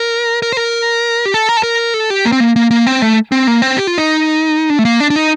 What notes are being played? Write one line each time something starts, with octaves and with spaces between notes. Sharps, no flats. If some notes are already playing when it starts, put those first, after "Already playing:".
Already playing: A#4
A#4
C5
A#4
G4
A4
A#4
A4
A#4
A4
G4
A#3
C4
A#3
A#3
A#3
C4
A3
C4
A#3
C4
G4
F4
D#4
D4
A3
A#3
D4
D4
D#4